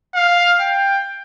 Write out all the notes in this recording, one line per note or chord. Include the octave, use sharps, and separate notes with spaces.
F5
G5